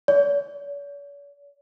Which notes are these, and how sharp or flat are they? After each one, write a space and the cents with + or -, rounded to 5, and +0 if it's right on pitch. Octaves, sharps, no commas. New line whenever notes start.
C#5 +45